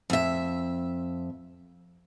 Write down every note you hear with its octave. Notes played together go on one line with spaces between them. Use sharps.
F2 E5